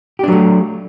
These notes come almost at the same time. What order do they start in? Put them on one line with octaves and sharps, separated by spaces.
G4 D4 F#3 A3